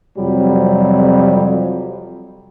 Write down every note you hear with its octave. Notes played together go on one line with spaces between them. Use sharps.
F2 C3 F#3 G3